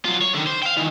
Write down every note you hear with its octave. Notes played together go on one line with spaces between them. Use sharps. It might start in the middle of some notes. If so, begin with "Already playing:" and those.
F#3 F4
C#5
D3 D#3
C5
F5 G5
D#3 E3